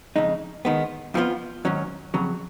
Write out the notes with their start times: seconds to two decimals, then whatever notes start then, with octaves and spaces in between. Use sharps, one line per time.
0.16 F2 C#3 G#3 D#4
0.65 D#3 G#3 B3
1.14 F2 F3 B3 F4
1.65 G#2 D#3 F#3 C#4
2.14 F2 C#3 F#3